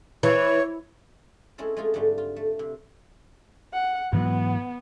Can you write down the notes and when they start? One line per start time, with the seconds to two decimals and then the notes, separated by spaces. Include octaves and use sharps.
0.23 E3 C#5
1.58 G#3 C4 C#4 E4 A4
1.77 G#3 A3 F4 G#4
1.94 G#2 D3 G3 A3
2.18 F4
2.36 A3
2.59 C3
3.73 F#5
4.13 G#2 E3 F#3 B3